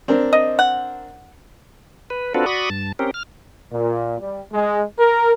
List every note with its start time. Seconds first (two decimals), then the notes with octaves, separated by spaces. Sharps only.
0.08 C4 D4 A#4
0.33 D#5
0.59 F#5
2.10 B4
2.34 C4 D4 F4 F#4 A4 B4
2.46 F#4 D5 B5 C#6 D#6
2.70 G2 A5
2.99 C4 C#4 G4 A#4
3.14 F6
3.72 A#2
4.21 G3
4.53 G#3
5.00 A#4